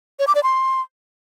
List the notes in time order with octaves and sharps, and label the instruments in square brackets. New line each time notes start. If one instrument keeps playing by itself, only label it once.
[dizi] C#5
D6
D5
C6